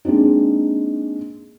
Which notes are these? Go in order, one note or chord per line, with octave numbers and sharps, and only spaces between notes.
G#3 A#3 C4 D4 D#4